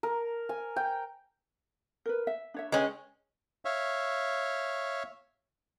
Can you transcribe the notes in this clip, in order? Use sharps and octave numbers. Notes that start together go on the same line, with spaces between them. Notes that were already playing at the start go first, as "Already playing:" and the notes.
A#4
G#5
G5
A#4 B4
E5
D4 C#5 E5
G#3 C#4 B4 D#5 G5
C#5 E5 F5